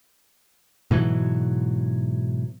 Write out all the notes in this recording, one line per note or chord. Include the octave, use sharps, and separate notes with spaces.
G#2 B2 E3 F#3